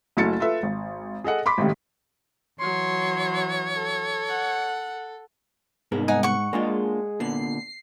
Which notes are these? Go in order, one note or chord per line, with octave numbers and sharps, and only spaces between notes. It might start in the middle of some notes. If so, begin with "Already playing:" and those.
F#1 A3 E4 F#4 A6 C#7
F4 A4 B4 E5
G#1
G#4 A4 D#5 F#5
B5 C6 D6 B6
G#1 A2 C3 D#3
E3 F#3 C#5 C6
A4
F#5
C2 G#2 B3 A#4
D#4 F#5 G#5
F#5 C#6
G#3 A#3 D4 F4
A#2 D3 B3 C7